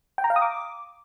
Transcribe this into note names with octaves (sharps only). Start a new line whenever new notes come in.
G5
A#5
F5
D#6
D6